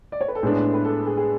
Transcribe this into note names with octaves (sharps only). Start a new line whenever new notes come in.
D5
C#5
B4
A4
A2 G#3 B3 D4 G#4
B4
A4
G#4
G#4